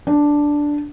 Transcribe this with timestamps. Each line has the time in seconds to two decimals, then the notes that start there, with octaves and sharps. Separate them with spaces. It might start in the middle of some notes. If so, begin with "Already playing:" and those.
0.07 D4